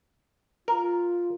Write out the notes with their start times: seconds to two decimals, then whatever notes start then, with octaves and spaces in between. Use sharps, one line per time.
0.68 F4 A#4